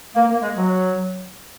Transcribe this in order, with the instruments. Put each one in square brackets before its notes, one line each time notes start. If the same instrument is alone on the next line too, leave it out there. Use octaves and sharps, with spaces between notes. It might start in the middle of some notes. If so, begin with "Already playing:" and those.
[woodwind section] A#3
A#3
G#3
F#3